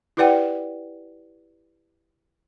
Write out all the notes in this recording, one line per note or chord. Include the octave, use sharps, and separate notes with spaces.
E4 G4 B4 D5 F#5 G5